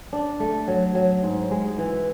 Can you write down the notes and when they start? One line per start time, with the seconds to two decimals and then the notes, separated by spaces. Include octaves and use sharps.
0.13 D4
0.40 A3
0.68 F#3
0.95 F#3
1.23 G#2
1.51 G#3
1.78 E3